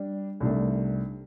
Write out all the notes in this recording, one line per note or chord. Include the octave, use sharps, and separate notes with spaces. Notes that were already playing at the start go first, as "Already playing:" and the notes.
Already playing: G3 D4
C2 C3 D#3 A3 D4